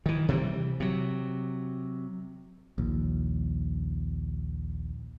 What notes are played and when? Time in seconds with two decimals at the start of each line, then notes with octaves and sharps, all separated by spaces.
0.06 D#3 E3
0.28 C3 E3 F3 G3
0.80 C3 F#3
2.78 A#1 D#2